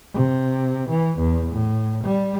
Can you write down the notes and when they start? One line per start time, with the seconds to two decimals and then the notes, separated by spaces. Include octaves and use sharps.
0.14 C3
0.90 E3
1.19 E2
1.52 A2
2.04 G3